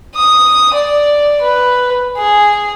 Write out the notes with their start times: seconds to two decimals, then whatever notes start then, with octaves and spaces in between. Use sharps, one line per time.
0.16 D#6
0.74 D5
1.41 B4
2.18 G#4